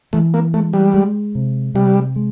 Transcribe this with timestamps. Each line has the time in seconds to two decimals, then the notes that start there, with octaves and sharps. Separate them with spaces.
0.13 E3 A3
0.34 A#3
0.54 G#3 A3
0.73 G3
0.94 G#3
1.35 C3
1.74 C3 G3
2.16 G#3